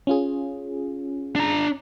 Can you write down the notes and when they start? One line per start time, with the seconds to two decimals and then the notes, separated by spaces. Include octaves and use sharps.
0.07 C#4 F4 G#4
1.36 D4 A#5